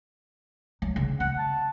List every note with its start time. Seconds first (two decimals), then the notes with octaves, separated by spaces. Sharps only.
0.82 F#3
0.96 C#3
1.20 B3 F#5
1.38 A5